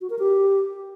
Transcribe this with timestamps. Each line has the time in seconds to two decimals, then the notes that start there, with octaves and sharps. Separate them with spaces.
0.01 F#4
0.10 A#4
0.19 G4